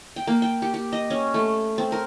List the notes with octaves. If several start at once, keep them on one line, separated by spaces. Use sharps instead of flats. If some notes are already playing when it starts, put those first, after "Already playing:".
G5
A#3
G5
G4
G4
D#5
C#4
A3
C4
A#4